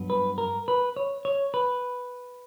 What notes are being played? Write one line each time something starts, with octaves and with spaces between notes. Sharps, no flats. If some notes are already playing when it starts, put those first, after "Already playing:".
Already playing: G2 F#3 B3
B4
A#4
B4
C#5
C#5
B4